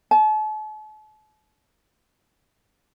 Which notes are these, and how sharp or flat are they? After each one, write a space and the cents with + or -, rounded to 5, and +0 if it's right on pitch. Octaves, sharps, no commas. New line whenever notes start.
A5 -40